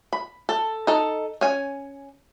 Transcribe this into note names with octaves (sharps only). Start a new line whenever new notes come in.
B5
A4
D#4 A4
C#4 G#5